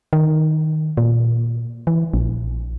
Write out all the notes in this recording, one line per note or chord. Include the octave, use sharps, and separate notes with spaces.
D#3
A#2
E3
A#1